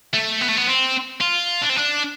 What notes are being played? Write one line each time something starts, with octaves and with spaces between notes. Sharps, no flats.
A3
B3
A3
B3
C4
F4
D4
C4
D4